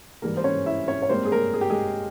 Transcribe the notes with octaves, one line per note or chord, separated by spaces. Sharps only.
G#2 E3 G3 A#3 A#4
C5
C#4 C#5
E4 E5
C#4 C#5
C#5
G#2 G3 A#3 C4 C5
G#4
A#3 A#4
G#4
G4
G#3 G#4